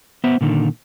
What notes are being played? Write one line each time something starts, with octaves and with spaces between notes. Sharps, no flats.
B3 C5 E5
A#2 D3 D#3